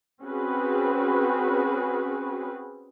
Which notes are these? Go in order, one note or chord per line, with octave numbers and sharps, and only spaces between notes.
C4 C#4 F#4 G#4 B4